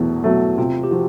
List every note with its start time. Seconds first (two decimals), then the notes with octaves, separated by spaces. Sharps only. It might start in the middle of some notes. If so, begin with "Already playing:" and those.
Already playing: E2 B2 F#3 A3 E4
0.24 B2 F#3 A3
0.58 C3 F4
0.84 G4
0.91 F3 F#4